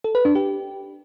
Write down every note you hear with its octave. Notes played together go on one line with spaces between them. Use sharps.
A4
B4
D4
G4